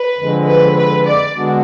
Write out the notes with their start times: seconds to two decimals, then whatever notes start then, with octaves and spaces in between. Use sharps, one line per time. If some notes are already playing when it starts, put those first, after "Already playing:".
Already playing: B4
0.17 F2 D3 G#3
0.47 B4
0.76 B4
1.06 D5
1.35 D3 G#3 B3 D4 F#4